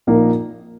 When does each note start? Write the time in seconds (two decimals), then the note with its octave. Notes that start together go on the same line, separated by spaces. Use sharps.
0.07 A#1 A#2 A#3 D#4 A#4